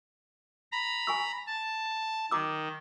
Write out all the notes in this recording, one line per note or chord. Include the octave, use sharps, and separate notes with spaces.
A#5 B5
G#5 C#6 E6
A5
D#3 A#5 D6 E6